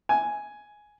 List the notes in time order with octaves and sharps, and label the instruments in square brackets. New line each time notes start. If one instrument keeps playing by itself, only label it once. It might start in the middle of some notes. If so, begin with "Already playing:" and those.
[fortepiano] G#5